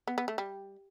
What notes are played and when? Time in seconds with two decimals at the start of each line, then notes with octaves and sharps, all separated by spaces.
0.07 B3
0.18 B3
0.28 A3
0.38 G3